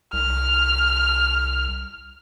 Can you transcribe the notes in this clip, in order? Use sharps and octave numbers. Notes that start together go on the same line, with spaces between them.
C2 F6